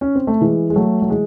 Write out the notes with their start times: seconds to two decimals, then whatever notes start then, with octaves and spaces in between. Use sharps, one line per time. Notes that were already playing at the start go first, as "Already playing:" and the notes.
0.01 C#4
0.15 C4
0.27 A3
0.41 E3 G#3
0.70 G#3
0.76 F#3 A3
1.02 F#3
1.10 E3 G#3